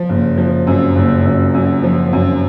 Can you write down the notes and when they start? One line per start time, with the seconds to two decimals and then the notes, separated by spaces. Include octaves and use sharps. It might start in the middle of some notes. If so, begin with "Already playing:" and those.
Already playing: F3
0.09 F#1
0.38 F3
0.67 F#2
0.96 F#1
1.25 F#2
1.54 F#2
1.83 F3
2.13 F#2